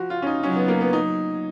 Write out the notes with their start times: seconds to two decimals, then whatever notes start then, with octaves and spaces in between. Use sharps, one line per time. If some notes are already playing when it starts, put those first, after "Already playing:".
Already playing: F3 F#4
0.10 F4
0.22 C#4
0.27 D#4
0.43 F#3 C#4
0.56 B3
0.68 A#3
0.81 B3
0.93 F#3 D#4